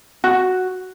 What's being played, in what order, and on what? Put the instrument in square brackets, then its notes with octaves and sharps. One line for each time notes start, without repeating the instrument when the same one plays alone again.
[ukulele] F#4